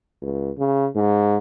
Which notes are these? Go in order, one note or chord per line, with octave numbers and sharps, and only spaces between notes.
C#2
C#3
G#2